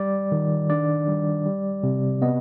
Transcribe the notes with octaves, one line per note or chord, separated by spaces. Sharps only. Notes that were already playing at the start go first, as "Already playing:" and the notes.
Already playing: G3 D5
D#3
D4 D5
G3
G3
C3
B3 D#5